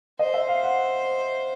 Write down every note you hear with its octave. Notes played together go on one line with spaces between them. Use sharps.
C5 D#5
E5
F5
F#5